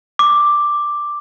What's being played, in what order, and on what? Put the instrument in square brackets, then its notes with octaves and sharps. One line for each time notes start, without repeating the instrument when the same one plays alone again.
[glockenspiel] D6